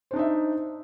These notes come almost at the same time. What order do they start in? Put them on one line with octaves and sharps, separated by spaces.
C5 D4 D#4 E5